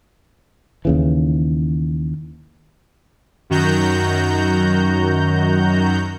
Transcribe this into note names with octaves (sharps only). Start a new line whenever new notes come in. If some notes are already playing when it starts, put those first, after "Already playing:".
D#2 C#3 E3
F#2 D#3 F#4 A#5 G6